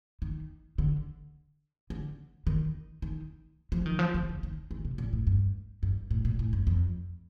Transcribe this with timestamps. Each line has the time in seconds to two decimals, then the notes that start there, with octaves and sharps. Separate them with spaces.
0.22 D#3
0.78 D3
1.90 D3
2.47 D#3
3.02 D#3
3.72 F3
3.86 D#3
3.99 F3
4.14 D#3
4.29 D3
4.43 D#3
4.71 D#3
4.85 C3
4.98 A#2
5.13 A2
5.27 G2
5.83 G2
6.10 A2
6.25 A#2
6.39 A2
6.53 G2
6.67 F2